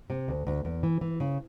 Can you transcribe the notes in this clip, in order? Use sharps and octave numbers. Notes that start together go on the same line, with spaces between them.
C3
D2
D2
E2
E3
E3
C#3